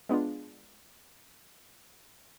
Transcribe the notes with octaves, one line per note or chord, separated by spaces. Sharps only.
G#3 B3 D4 F4